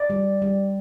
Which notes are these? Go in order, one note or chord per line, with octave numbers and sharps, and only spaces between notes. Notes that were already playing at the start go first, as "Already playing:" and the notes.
Already playing: D5
G3
G3